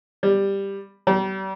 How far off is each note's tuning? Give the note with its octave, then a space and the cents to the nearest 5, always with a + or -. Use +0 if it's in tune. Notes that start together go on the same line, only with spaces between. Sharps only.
G3 +10
G3 -35